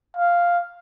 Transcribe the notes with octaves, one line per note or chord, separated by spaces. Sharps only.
F5